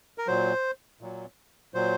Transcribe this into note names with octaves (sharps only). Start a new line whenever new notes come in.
A#4
A#2 F#3 C5
A#2 F#3
A#2 F#3 C5